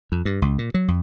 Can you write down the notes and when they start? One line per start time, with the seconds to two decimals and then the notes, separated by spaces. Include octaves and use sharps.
0.12 F2
0.25 G2
0.42 C#2
0.58 A#2
0.74 F#3
0.88 F2